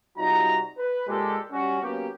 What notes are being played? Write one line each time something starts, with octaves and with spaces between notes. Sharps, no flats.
C3 G3 D#4 F4 F#4 A#5
B4
A#2 G#3 G4 A4
G3 C#4 F#4
F#3 A#3 B3 C#4 G4